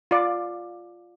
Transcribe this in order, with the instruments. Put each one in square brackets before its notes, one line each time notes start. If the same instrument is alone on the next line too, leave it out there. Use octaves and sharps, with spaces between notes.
[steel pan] F4 D5